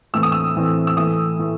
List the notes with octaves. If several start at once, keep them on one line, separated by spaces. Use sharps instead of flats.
A2 E3 A3 C4 E6
D#6
E6
A2 E3 A3 C4
E6
A2 E3 A3 D#6
A2 E3 A3